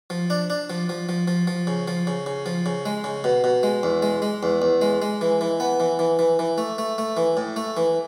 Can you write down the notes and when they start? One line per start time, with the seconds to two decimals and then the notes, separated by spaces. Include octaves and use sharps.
0.10 F3
0.30 D4
0.50 D4
0.70 F3
0.89 F3
1.09 F3
1.28 F3
1.47 F3
1.67 C#3
1.88 F3
2.07 C#3
2.26 C#3
2.46 F3
2.66 C#3
2.86 G#3
3.04 C#3
3.24 B2
3.44 B2
3.63 G#3
3.83 E2
4.02 G#3
4.22 G#3
4.43 E2
4.62 E2
4.81 G#3
5.02 G#3
5.21 E3
5.41 E3
5.60 B3
5.80 E3
5.99 E3
6.19 E3
6.39 E3
6.58 A3
6.78 A3
6.98 A3
7.17 E3
7.37 A2
7.56 A3
7.77 E3